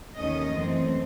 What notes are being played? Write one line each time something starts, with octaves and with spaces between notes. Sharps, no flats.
D#2 D#3 A3 C#4 D#5
F#2 E3 A3 C4